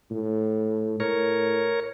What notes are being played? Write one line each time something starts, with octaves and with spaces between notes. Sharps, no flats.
A2
A2 A#4 C#5